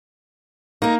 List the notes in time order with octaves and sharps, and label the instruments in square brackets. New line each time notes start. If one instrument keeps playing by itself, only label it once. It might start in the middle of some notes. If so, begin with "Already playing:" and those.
[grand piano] A#3 [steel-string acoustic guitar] D#4 A#4